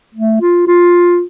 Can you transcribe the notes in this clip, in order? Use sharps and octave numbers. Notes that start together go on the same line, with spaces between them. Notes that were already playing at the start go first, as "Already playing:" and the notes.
A3
F4
F4